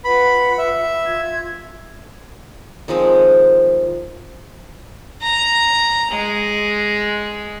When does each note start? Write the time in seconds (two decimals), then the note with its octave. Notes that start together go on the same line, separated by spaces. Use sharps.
0.04 F4 B4 F#5 B5
0.58 E5
1.05 F4 G#6
2.88 D#3 F3 G#3 C4
5.22 A#5
6.12 G#3